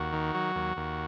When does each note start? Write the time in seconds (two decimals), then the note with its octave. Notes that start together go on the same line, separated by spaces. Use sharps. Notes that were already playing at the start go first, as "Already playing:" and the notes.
Already playing: D#2 F#4
0.13 D#3
0.35 F#3
0.56 D#2
0.77 D#2